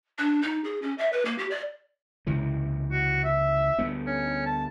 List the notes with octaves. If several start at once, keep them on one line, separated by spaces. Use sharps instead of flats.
D4
D#4
G#4
C#4
E5
B4
A#3
G4
D5
C#2 C3 E3
F#4
E5
D2 G3 B3
C#4
A5